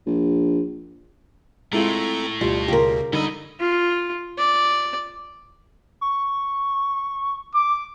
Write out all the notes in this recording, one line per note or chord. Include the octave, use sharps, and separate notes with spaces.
A#1
A2 G#3 C4 E4 F4 A4 A#5
D2 B2 G3 F4
C#3 F4 G4 A#4
G#2 D3 G3 D#4 D#5 B5 E6
F4
D5
C#6
D6